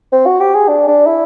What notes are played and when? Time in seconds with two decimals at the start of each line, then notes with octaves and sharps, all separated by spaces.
0.12 C4
0.26 F#4
0.40 G4
0.55 G#4
0.68 D4
0.88 D4
1.07 E4